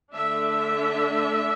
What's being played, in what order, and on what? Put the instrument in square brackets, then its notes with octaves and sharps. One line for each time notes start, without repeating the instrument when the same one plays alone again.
[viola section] D3 A3 D4 E5